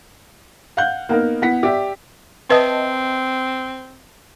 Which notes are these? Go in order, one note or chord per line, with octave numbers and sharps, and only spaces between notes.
F5 F#5 F#6 G6
A#3 B3 D#4 A#4
B3 E4 F#5 B6
G4 D5 E5
C4 B4 D#5 E5 A5